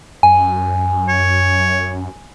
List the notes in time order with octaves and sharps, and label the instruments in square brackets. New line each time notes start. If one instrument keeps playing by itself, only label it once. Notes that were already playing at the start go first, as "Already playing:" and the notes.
[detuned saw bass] F#2 [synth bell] G#5
[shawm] C#5